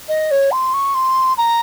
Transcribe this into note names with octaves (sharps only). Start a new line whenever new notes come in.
D#5
C#5
C6
C#6
C6
A#5